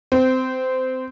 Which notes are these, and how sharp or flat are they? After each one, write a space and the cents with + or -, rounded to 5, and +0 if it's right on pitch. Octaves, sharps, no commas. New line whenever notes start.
C4 -20